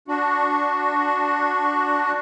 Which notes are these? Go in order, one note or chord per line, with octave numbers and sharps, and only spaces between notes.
D4 F#4